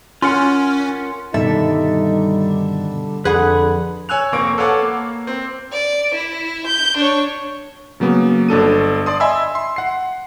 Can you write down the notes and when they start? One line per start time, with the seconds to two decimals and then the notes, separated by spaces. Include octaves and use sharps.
0.22 C#4 F4 A#4 F#5
1.34 G2 B2 D3 D#3 G3 D#4 A4 E5
3.25 F2 D3 G#4 B4 F#5 B5 F#6
4.09 C#5 G#5 E6 F#6 F7
4.32 F1 A#3 C4 C#6 D7
4.58 A4 B4 C#5 F5 F#5 D6
4.82 A#3
5.27 C4
5.72 D5
6.15 E4
6.67 G6
6.97 D4 C#5
8.00 C#3 F#3 A#3 B3
8.49 G1 D4 A4 D#7
9.06 D5 A5 C6 D#6
9.20 D#5 E5 G#5 B5 C6 E6
9.55 C6
9.76 F#5 C7